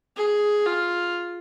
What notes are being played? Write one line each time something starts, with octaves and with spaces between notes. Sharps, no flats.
G#4
F4